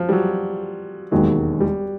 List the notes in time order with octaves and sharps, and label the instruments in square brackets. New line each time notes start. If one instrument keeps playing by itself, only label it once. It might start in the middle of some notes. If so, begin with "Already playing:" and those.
Already playing: [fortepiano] F3
G3
F#3
[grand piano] E1 D#2 D#3 G#3 [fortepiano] F#3
[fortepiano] G3